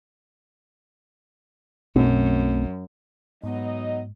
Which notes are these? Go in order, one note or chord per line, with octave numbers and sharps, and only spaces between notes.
B1 F#2 A3 C4
G#2 F#3 B3 D#4 D#5